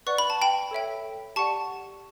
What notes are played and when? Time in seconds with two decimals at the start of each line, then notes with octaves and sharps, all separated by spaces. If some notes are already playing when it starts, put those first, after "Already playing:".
0.07 B4 D5 F#5 C#6
0.18 B5
0.30 A5
0.42 G5 B5
0.71 A4 C#5 E5 G5
1.36 G4 D5 F#5 A5 C#6